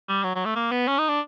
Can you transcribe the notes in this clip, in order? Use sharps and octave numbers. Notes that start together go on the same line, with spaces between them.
G3
F#3
F#3
A3
A#3
B3
C#4
D#4
D4